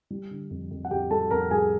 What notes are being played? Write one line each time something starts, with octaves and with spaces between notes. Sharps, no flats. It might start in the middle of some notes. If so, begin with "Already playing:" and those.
G3
D3
F2
F2
F#5
F2 G4 G5
G3 A4 A5
F2 A#4 A#5
G3 G#4 G#5